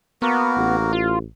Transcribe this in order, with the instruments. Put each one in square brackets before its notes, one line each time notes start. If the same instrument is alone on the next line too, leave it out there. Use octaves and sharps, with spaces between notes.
[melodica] A#3 F#4 A#4 [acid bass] B3
[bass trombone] A1
[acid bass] F4